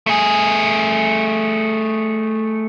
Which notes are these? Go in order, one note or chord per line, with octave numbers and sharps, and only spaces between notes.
A3 G#4